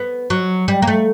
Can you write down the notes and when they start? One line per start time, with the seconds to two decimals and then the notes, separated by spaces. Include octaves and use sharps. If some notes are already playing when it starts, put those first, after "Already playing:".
Already playing: B3
0.30 F#3
0.68 G3
0.82 A#3
0.87 A3